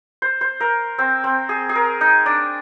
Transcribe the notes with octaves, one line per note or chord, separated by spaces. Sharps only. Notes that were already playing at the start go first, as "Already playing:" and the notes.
C5
C5
A#4
C4
C4
G#4
G#4
A#4
D#4
D4